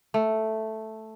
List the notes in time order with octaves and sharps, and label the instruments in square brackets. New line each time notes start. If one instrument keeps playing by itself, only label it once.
[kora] A3